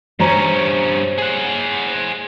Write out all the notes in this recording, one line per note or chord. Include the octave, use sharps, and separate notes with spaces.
G2 C#4 C5 C#5 A#5
G#4 F#5